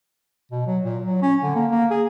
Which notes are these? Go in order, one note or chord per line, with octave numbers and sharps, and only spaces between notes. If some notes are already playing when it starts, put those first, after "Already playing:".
B2
F#3
A#2
F#3
C#4
D3
A#3
A#3
G#4